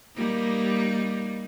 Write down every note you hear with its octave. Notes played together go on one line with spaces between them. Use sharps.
G3 A#3 D#4